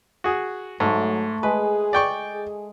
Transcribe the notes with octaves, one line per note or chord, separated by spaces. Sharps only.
F#4 G#4
G#2 F#3 A3
G#3 G#4 B4
D5 G5 C#6
G#4